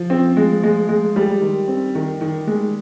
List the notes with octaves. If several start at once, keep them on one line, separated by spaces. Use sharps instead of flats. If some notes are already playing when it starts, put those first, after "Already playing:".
Already playing: F3
C4
G#3
G#3
G#3
G3 G#3
D#3
C4
D#3
D#3
G#3